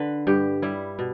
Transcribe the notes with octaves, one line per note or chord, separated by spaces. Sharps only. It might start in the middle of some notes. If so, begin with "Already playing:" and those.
Already playing: D3 B4
G2 G4
G3 E4
B2